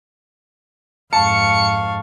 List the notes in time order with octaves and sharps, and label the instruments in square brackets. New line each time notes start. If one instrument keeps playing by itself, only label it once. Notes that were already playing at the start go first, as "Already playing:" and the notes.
[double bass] F2 G#2 [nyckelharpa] F5 C#6 [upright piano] A5 [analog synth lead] C#7